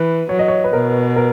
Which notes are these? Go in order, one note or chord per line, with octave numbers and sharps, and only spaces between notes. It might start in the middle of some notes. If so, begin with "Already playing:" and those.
Already playing: E3 B4
F#3 C#5
D#5
C#5
B4
B2 A#4
A#4